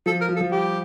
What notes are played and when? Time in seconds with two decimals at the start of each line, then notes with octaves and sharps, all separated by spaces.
0.06 F3 A4
0.21 A#4
0.29 F3
0.36 A4
0.41 F3
0.51 G3 G4